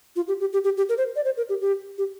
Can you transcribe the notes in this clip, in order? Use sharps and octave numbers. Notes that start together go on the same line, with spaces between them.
F4
G4
G4
G4
G4
G4
A#4
C5
D5
C5
A#4
G4
G4
G4